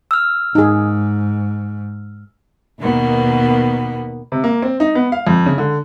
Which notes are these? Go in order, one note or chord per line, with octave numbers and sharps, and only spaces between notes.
E6 F6
G#2 D#4 G#4
D#2 B2 D#3 A#3 B3
C3
A#3
C4
D#4
B3
F5
F2
C#3
D3